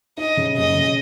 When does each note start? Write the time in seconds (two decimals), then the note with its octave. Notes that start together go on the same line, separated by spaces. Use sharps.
0.17 D#4 D#5
0.37 C#3
0.57 F#1 D#5
0.76 C#3